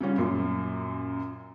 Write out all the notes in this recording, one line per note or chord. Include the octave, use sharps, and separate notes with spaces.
C#3 G3 C#4 F4
F#2 A#2